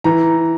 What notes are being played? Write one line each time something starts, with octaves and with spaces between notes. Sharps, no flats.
E3 A#5